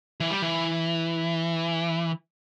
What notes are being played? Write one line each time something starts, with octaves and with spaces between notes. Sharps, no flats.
E3
G3
E3